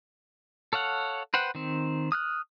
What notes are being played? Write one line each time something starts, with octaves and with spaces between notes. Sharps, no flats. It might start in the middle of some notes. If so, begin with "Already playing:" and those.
A4 C#5 F5 F#5
B4 C5 F#5 G5
D#3 C4
D#6 F6 F#6